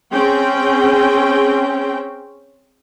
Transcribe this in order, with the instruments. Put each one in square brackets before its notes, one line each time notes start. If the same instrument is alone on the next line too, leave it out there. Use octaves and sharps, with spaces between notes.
[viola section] C4 C#4 G#4 G5